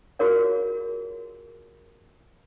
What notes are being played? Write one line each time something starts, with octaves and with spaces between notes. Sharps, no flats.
F4 F#4 G#4 A#4 C#5 F5